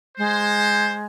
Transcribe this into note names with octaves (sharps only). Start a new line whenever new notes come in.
G#3 C5